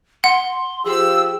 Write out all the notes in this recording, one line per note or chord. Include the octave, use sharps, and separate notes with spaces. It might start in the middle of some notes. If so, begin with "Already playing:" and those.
F#5 C6
F3 G4 G#4 E6